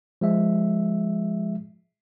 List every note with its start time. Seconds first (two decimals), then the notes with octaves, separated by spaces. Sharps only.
0.21 F3 G#3 E5